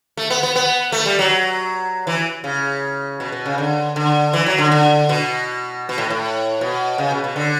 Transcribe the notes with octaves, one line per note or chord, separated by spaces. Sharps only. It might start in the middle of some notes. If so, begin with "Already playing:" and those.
A3
B3
B3
B3
A3
G3
F#3
E3
C#3
B2
B2
C#3
D3
D3
E3
F#3
D3
D3
B2
B2
A2
A2
B2
C#3
B2
B2
D3